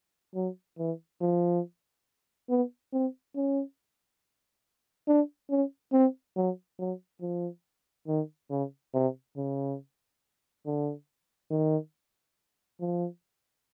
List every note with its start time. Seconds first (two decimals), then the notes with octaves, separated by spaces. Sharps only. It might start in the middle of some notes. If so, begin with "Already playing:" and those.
0.35 F#3
0.78 E3
1.21 F3
2.49 B3
2.93 C4
3.36 C#4
5.08 D4
5.50 C#4
5.93 C4
6.36 F#3
6.79 F#3
7.21 F3
8.08 D#3
8.50 C#3
8.94 C3
9.36 C#3
10.66 D3
11.51 D#3
12.80 F3